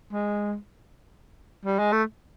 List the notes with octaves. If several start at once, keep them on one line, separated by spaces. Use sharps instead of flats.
G#3
G3
G#3
A3